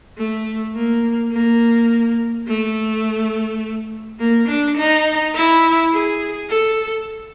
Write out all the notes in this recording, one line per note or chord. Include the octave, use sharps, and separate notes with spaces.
A3
A#3
A#3
A3
A#3
D4
D#4
E4
G#4
A4